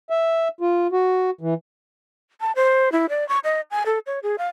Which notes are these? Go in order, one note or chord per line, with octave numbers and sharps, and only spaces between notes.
E5
F4
F#4
E3
A5
C5
E4
D5
C#6
D#5
G#5
A4
C#5
G#4
F5